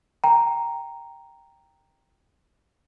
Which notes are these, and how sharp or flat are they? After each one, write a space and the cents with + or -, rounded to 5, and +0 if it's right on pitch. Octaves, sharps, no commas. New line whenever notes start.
G5 +0 A#5 +0